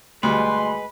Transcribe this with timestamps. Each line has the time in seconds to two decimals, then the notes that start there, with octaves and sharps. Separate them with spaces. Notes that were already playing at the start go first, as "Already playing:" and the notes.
0.23 D2 B2 G3 G#3 B4 C6